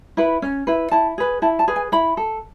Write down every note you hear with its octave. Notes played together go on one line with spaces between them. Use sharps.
E4 B4
C#4
E4 B4
E4 A5
G#4 B4
E4 A5
A5
G#4 B4
G#5
E4 B5
A4